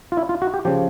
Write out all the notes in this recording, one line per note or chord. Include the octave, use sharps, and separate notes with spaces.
F4
E4
F4
F#4
G4
C#3 F3 G4